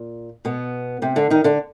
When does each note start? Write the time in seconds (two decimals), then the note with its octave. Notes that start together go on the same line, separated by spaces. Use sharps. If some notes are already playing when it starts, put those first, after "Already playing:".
Already playing: A#2
0.45 B2 B3
1.02 C3 C4
1.16 D3 D4
1.30 D#3 D#4
1.44 D3 D4